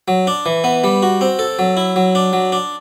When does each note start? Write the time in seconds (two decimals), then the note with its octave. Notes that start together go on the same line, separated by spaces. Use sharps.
0.08 F#3
0.27 D4
0.46 E3
0.64 B3
0.84 G3
1.03 F#4
1.21 C4
1.39 A4
1.59 F#3
1.77 E4
1.96 F#3
2.15 D4
2.33 F#3
2.52 D4